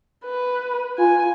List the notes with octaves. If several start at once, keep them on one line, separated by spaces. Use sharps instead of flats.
B4
F4 G#5